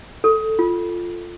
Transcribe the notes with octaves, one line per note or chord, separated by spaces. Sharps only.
A4
F4